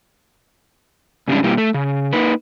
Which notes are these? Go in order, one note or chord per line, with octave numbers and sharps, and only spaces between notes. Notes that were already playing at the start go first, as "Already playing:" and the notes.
G#2 C#3 G3 G#3 C#4 D4
B2 G3 A#3 E4 G4
A3 A4
C#3
A#3 D#4 B4